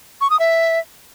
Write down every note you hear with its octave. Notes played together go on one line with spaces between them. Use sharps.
C#6
D#6
E5